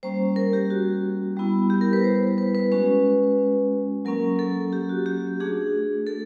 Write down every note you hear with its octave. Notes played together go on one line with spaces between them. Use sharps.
G3 A#3 C#4 C5
A#4
G4
F#4
G3 B3 E4
G4
A#4
B4
C5
B4
B4
G#3 C#4 F#4 B4
F#3 A#3 C#4 A#4
A4
G4
F#4
G4
A3 D4 F#4 G#4
A4